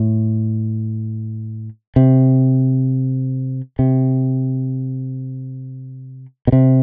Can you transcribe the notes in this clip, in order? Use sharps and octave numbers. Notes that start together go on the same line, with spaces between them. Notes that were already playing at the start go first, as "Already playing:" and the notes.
Already playing: A2
C3
C3
B2
C3